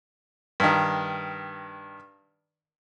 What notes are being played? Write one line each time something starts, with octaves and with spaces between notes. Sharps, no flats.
G2 D#3